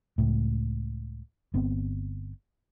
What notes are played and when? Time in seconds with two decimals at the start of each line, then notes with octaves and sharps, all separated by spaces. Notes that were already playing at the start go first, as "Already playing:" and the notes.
0.18 C#2 A2
1.54 G1 B3 C4